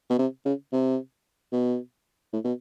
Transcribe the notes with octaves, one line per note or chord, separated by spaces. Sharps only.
B2
C3
C#3
C3
B2
A2
B2